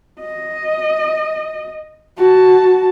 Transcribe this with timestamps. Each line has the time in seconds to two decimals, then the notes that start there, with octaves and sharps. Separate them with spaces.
0.20 D#5
2.18 F#4 A5